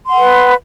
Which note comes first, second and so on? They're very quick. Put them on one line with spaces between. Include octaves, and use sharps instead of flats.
C6 F#5 B4